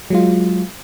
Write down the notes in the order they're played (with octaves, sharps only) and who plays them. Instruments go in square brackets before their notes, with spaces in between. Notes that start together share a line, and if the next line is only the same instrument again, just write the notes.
[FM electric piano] F#3 G#3 F4